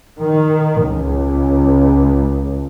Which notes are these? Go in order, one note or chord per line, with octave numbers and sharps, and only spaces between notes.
D#3
C#2